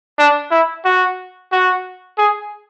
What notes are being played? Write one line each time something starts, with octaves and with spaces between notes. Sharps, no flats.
D4
E4
F#4
F#4
G#4